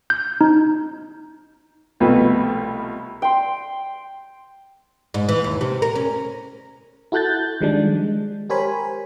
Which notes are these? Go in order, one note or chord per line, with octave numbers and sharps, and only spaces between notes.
G6
D#4
C2 B2 F3 A3 B4
G5 C6
G#2
E3
D#2
C3
A#4
C#4
E4 F#4 A4 F#6 G6 A6
D#3 F3 G3 G#3 D4
G#3
G4 A#4 C5 C#5 G#5 B5